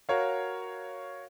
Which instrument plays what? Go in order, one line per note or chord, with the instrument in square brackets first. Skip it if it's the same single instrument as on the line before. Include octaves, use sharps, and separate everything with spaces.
[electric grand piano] F#4 A#4 C#5 F5